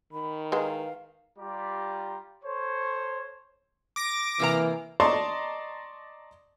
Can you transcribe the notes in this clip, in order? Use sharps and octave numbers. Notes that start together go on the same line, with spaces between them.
D#3 B5
G#3 E4 B4 F5 F#5
G3 F4 G4 D5 A#5
A4 C5 C#5
D6 A#6 D7
C3 E3 A#3 A#5
D5 D#5 A5 A#5 C6 C#6